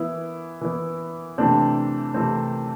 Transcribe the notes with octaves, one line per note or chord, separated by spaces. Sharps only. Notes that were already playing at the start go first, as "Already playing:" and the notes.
Already playing: E3 B3 E4
E3 B3
C3 E3 A3 C4 D4
C3 E3 A3 C4